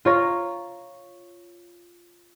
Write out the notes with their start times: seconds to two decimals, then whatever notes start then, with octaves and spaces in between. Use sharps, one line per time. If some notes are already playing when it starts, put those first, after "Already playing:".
0.05 F4 C#5 A#5